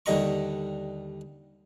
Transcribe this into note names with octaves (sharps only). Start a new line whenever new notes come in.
D#2 D3 G3 D#4 A#5 C#6